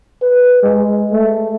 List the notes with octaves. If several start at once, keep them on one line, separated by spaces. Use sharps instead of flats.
B4
G#3
A3